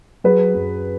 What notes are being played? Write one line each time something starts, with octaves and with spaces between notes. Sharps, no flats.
F#3 G#4 B4
F#2